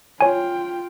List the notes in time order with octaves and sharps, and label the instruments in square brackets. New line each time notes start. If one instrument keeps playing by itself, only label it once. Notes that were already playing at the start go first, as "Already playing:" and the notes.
[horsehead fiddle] F4 G5 [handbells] C#5 G#5